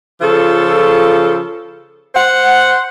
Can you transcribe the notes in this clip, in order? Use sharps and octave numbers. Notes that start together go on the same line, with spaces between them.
C#3 F3 F4 A4
C5 F#5